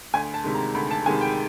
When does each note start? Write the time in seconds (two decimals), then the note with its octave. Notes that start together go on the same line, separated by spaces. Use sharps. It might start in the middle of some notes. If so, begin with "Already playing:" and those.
0.14 D2 G#5
0.34 A5
0.44 C3 D#3 G#3
0.54 A#5
0.75 D2 B5
0.91 A5
1.06 C3 D#3 G#3 G#5
1.21 G5